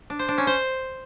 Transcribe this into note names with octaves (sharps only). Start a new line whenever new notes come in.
D4
C5
D4
C#4
C5